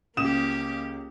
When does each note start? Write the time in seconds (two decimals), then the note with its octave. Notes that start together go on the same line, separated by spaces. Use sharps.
0.17 C#2 A#3 C#4 G4 D#6 E7